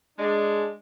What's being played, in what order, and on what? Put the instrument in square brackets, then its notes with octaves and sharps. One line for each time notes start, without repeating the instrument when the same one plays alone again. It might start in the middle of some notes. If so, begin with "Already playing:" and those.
[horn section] G#3 D4